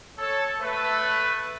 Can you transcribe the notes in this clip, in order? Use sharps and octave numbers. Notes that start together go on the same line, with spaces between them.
A4 C#5
A3 B4